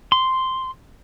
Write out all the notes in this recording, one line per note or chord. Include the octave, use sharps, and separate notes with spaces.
C6